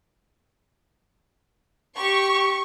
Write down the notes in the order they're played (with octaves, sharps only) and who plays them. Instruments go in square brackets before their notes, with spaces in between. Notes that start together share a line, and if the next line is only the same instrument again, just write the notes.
[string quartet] G4 [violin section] C#6